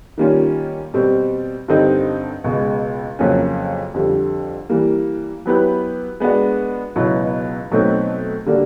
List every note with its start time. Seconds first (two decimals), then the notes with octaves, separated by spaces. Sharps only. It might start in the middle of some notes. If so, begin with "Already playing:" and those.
0.18 D#3 G3 A#3 C#4 F4
0.94 B2 G3 C4
1.68 G2 D3 G3 C4 D#4
2.44 C#2 B2 G#3
3.19 F2 C#3 F#3 A#3 C#4
3.94 F2 D3 G3
4.69 E3 G3 A#3
5.45 F#3 B3 E4 G4 B4
6.20 G#3 B3 D4 F#4
6.95 C#2 B2 F#3 B3 E4
7.71 B2 F#3 A3 C4 D#4
8.46 D3 G3 A#3 D4 F#4